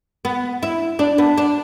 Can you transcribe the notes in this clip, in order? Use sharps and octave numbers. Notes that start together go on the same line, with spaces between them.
B3
E4
D4
B3
D4